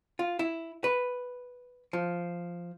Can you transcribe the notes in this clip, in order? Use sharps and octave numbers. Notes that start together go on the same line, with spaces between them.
F4
E4
B4
F3